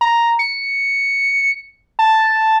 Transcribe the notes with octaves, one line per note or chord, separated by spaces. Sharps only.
A#5
C#7
A5